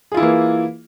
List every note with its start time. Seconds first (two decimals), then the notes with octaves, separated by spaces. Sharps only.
0.12 G#4
0.14 F4
0.17 E4
0.20 E3
0.23 A#3